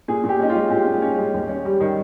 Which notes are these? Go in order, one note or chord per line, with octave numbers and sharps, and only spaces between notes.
A#2 G#4
A#2
G4
C#4 D#4
F4
G#3
A#2 G4
A#2
C#4
G#3
D#2
C#4
G3
D#3